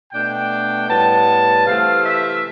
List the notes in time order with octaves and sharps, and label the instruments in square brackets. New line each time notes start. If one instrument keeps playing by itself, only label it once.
[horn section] B2 A3 D4 G5
A2 G3 B3 A5
C3 E3 A3 F5
E5